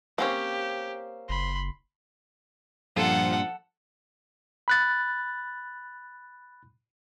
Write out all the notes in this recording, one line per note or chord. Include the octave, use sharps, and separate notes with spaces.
A#3 C4 C#4 G4
F#1 B5 C6
G2 A#2 F3 F4 A4 F#5
B5 F#6 A6